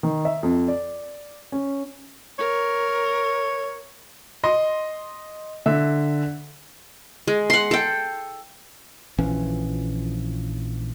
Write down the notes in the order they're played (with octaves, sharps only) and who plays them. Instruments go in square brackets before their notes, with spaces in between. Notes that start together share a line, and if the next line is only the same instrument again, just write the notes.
[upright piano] D#3
E5
F2
D5
C#4
[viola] A#4 [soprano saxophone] C#5
[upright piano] D#5 C6
[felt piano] D3 [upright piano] E5
[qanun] G#3
F#5 C6
A4 G5
[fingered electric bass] A#1 E3 F3 C#4